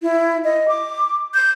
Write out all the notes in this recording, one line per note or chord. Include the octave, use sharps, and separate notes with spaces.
E4
D#5
D6
G6